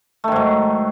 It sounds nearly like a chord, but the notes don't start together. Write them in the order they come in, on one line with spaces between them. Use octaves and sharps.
A3 D#3 G#2 F#3